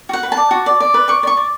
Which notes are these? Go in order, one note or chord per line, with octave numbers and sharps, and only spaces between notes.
F#4 F#5
B4
A5
D5
F#4
D5
D5
B4
D5 C#6
D5
C#6
D5